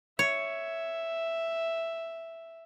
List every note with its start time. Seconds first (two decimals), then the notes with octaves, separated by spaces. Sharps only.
0.19 C#5 E5